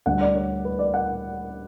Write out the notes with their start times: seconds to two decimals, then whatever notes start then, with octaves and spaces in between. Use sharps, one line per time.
0.06 D2 D3 G3 F#5
0.21 D5
0.35 C#5
0.65 B4
0.79 D5
0.94 F#5